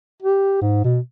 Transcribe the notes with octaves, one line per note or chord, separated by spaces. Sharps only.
G4
G#2
B2